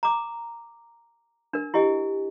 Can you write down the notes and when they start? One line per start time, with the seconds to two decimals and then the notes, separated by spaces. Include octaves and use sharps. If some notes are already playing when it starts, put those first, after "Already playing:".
0.03 A#5 D6
1.53 D4 A#4
1.74 E4 G4 D#5 G#5